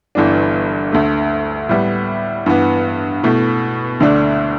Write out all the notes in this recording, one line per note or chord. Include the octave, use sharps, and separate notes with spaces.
G1 G2 E3 B3 D4
D2 D3 A3
A2 G3 B3
G2 E3 B3
B2 A3 E4
D2 D3 A3 D4